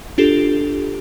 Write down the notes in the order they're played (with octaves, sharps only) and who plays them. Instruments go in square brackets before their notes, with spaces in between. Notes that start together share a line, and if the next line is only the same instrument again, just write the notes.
[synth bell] D4 F4 G4 A4